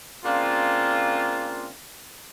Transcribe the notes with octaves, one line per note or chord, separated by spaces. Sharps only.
C#3 A#3 C4 D4 F4